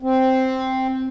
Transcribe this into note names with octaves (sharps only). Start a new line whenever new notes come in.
C4